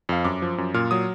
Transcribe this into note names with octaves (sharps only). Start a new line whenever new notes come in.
F2 F5
F#2 D6
F3
F#2
A#2 F6
F#3 D#6